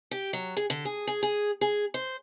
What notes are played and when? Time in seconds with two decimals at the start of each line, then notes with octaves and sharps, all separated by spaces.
0.11 G4
0.33 F#3
0.57 G#4
0.70 D3
0.85 G#4
1.07 G#4
1.23 G#4
1.61 G#4
1.94 C5